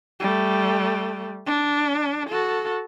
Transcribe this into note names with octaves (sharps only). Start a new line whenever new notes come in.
G3 A3
D4
F#4 A4